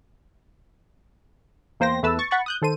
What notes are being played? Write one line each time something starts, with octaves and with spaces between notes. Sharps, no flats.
E2 A#3 C5 G5 A#6
E2 A3 B4 A5 E6
C#6 A6
F#5 B5 C#6 A6
D#6 F#6 G6
D#3 A4 C5 D#7